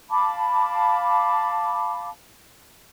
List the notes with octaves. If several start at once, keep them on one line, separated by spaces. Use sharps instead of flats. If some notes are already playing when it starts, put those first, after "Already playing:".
F5 A5 B5 D6